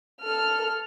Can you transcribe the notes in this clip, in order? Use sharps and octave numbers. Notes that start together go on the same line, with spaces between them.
A4 F6